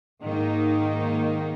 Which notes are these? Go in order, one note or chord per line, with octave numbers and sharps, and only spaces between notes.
G#2 D#3 A#3 D#4